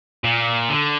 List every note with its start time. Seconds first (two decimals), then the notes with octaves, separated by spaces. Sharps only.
0.24 A#2
0.69 D3